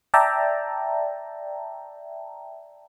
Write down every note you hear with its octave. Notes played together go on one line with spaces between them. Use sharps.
D5 E5 G5 A5 A#5